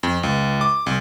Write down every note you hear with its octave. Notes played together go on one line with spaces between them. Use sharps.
F2
C#2
D6
C2